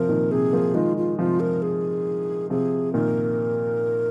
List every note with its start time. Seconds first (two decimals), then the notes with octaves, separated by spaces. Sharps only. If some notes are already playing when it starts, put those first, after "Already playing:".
Already playing: C3 F3 A#4
0.09 A#2 D#3
0.31 C3 G#4
0.53 F3 A#3
0.74 D#3 G#3 F4
0.97 F4
1.19 C3 F3 F4
1.40 A#4
1.62 G#4
2.50 C3 F3 G#4
2.93 A#2 D#3 A#4